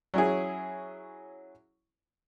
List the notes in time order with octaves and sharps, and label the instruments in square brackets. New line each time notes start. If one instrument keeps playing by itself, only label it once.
[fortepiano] F#3 C#4 E4 G#4